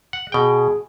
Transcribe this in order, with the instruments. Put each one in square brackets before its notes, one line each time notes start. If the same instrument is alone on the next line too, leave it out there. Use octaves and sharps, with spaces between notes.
[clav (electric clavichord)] F#5
[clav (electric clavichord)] B2 G5 [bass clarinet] G#4